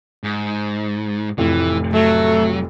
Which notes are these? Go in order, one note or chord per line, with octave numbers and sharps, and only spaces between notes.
G#2
F1 F2 A2 E3
F#3 A3